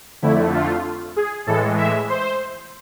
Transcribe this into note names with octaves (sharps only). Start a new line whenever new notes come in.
F2 D3 A3 E4
F4
G#4
A2 E3 G#3 A4
E5
C5